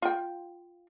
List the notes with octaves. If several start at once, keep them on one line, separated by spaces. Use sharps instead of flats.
F4 G5